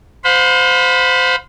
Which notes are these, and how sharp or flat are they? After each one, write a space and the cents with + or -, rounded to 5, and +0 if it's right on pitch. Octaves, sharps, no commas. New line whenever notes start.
C5 -20 F5 +40 B5 +0